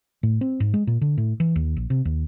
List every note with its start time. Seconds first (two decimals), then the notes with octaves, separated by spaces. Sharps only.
0.23 A2
0.41 C4
0.60 G#2
0.74 G#3
0.87 A#2
1.01 D3
1.18 A2
1.40 E3
1.56 D#2
1.77 A#1
1.90 C3
2.05 D#2